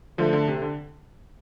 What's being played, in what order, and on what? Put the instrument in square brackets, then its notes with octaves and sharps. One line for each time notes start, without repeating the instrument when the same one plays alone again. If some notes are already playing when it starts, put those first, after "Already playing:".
[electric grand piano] D3 F3 [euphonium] A3
[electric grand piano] D3
C3
D3